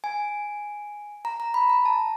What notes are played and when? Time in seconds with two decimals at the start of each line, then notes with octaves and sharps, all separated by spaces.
0.04 G#5
1.25 A#5
1.40 A#5
1.54 B5
1.70 A#5
1.85 A5